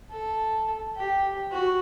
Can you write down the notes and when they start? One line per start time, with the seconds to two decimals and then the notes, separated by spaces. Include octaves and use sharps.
0.11 A4
0.96 G4
1.51 F#4